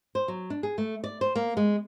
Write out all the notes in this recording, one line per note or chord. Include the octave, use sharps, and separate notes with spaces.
C5
F#3
D4
G#4
A3
D5
C5
A#3
G#3